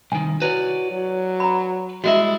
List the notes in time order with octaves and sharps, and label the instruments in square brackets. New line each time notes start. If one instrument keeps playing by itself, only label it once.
[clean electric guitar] C2 D#3 [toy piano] G#5
[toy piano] E4 [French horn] F#4 [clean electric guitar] B4 C#5 D5
[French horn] F#3
[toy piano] A#5 B5
[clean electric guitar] G3 G#3 E4 [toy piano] F#4 D#5 E5